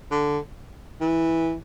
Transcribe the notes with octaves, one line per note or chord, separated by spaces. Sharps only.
D3
E3